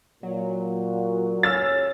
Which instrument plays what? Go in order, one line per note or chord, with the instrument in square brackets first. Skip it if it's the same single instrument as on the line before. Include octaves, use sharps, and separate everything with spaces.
[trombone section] A#2 [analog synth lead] F#3
[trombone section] C#2 C#4 [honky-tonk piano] E6 F6 A6